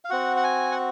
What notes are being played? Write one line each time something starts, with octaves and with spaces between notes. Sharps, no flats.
F5
C4 F#4 F#5
F#5
G#5
F#5